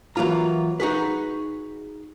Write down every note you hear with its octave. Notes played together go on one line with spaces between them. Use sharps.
E3 F#3 A#3 F4 A#5
D#4 F#4 G#4 B4